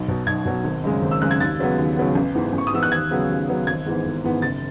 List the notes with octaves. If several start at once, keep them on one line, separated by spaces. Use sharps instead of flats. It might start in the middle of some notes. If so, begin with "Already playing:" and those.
Already playing: B1
B2 F#3
B1 G#6
B2 F#3
G#1
F#2 C#3 G#3
G#1
E6
F#2 C#3 G#3 F#6
G#6
D#2 A6
C#3 F#3 B3
D#2
C#3 F#3 B3
A1
G#2 E3 B3
A1
C#6
D#6
G#2 E3 B3 E6
F#6
D#2 G#6
C#3 F#3 B3
D#2
C#3 F#3 B3
G#1 G#6
G#2 E3 B3
G#1
G#2 E3 B3
F#1 A6